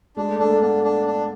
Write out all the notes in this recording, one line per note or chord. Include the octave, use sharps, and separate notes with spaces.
G#3 D4
A3
A3 D4
A#3
B3 D4
D4
D4